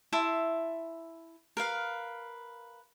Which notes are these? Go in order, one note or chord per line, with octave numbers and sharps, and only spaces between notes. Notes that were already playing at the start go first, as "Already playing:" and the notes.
E4 E5 A5 C6
A#4 B4 F5